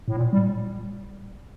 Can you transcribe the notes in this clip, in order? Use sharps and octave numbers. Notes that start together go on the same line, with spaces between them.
A2
A#2
G3